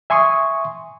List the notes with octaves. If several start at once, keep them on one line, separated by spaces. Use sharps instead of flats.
E5 G#5 C6 C#6 D#6